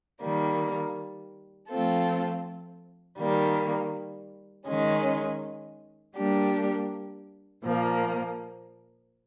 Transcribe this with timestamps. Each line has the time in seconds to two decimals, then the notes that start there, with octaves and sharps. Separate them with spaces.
0.21 D#3 G3 A#3
1.69 F3 A3 C4 F4 A4
3.18 D#3 G3 A#3
4.66 D#3 G#3 C#4
6.14 G3 A#3 D4 G4
7.63 A#2 F3 A#3